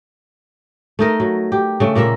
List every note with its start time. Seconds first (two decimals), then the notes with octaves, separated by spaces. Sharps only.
0.99 A3 D#4 A#4
1.20 F#3
1.52 G4
1.80 C#3 A3
1.95 A#2 A#3 A#4 E5